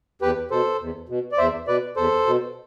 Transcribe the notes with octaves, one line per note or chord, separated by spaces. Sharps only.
E2 G4 B4
B2 A4 C5
E2
B2
D5
E2 C5 E5
B2 B4 D5
E2 A4 C5
B2